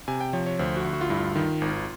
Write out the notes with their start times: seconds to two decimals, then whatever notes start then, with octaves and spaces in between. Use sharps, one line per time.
0.08 C3 G#5
0.21 G5
0.33 F3 C#5
0.47 C#5
0.59 D2 C5
0.76 F#4
0.84 D2
0.93 F#4
1.01 F4
1.09 G2 E4
1.17 F4
1.36 D#3
1.61 G#1